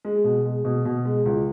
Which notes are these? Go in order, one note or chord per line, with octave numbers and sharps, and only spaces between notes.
G#3
B2
G#3
B2
B2
G#3
C#2